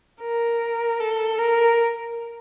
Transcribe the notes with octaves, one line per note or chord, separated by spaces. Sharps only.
A#4
A4
A#4